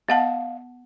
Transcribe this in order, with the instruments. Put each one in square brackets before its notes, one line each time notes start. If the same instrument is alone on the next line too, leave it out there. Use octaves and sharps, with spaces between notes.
[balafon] B3 F#5 A5 [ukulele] D#5 F5